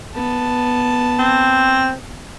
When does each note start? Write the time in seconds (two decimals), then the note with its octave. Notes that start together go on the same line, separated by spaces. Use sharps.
0.15 B3 A5
1.19 C4